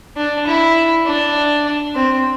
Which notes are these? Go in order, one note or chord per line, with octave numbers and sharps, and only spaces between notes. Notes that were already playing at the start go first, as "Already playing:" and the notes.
D4
E4
D4
C4